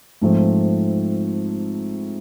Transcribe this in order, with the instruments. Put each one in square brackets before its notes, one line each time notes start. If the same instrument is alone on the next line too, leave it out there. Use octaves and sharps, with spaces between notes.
[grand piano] G#2 F3 A3 C4